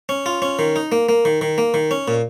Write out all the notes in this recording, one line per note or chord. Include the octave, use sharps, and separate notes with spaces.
C#4
F4
C#4
D#3
D#4
A#3
A#3
D#3
D#3
A#3
D#3
C#4
A#2